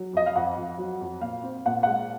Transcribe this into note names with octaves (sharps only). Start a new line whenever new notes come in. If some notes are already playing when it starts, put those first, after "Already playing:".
Already playing: F#3
F2 D#5
F5
F2 F#5
F2
F#3
F2
A#2 F5
C4
A#2 F#5
G#3 F#5